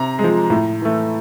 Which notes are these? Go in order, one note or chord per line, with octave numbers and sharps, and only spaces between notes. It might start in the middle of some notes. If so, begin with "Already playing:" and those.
Already playing: C3 A#5
F3 G#3
A2
E3 A3